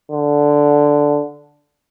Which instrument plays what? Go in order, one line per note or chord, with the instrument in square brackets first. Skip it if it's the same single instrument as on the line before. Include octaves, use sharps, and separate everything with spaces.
[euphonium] D3